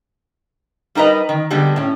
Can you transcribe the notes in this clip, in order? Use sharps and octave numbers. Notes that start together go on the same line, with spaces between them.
G3 D#4 A#4 B4 D#5
D#3
D3 G3 G#3 B3
A2 C#4